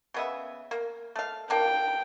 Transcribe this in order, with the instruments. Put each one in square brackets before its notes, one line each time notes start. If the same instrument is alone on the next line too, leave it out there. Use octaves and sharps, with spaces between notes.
[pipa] C#3 B3 E5
A#3
A3 F5
[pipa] A#3 D4 [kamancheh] G5